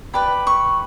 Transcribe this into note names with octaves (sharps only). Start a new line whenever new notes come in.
G4 B4 D5 B5
C#6